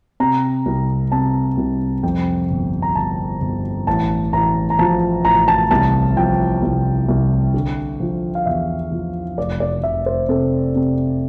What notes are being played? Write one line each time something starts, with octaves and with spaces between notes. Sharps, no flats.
C3 A#5
C2
C3 A5
C2
F2 G5
G1
A#5
G1 A5
G1
A1 A5
A1 A#5
A#5
F3 A5
A1 A#5
A5
C2 A5
F3 G5
C2
C2
D3
F3
F5
E2 E5
F3
F1 D5
D5
F1 E5
C5
C3 A4
C3